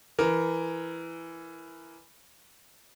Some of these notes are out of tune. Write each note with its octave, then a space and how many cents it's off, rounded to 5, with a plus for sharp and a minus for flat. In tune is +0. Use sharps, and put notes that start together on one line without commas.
E3 +10 A#4 +0